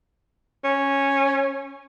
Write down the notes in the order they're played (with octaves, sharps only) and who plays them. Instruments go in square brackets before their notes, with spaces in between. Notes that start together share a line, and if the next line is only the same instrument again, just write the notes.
[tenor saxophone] C#4